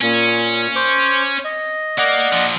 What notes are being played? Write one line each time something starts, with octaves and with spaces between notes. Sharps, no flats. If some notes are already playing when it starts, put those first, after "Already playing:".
A#2 C#4
C5 C#6 D6
D#5
A#3 D5 D#5 F#5
A#2 F3